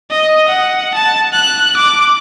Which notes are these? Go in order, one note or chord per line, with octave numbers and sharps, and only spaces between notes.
D#5
F#5
A5
F#6
D6